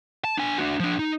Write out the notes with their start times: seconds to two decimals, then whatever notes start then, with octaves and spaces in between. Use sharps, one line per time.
0.24 A5
0.38 D4 G#5
0.58 D4 F#4
0.80 F3 D4
0.99 D#4